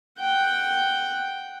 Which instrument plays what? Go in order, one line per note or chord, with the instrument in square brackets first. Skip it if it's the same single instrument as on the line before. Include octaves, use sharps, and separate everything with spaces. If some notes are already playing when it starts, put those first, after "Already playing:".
[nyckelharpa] F#5 G5